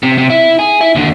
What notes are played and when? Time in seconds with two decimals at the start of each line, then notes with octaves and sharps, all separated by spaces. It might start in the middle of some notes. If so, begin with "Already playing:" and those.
0.03 C3
0.18 C3
0.30 E4
0.59 G#4
0.81 E4
0.95 D#2 D3